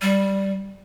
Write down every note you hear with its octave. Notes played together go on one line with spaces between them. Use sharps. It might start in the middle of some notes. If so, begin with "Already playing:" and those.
G3